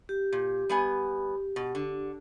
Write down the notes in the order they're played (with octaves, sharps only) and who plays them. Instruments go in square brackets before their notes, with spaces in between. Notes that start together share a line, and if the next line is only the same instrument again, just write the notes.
[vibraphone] G4
[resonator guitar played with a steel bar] A#2
G3 B3 G#5
B2
D3